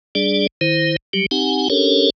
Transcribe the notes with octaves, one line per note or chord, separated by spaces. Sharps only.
G3 D4 G#4 D5
D#3 E4 C5
F#3 G3 G4
C4 D#4 G4 F#5 G#5
C#4 D4 G4 A4 A#4 C#5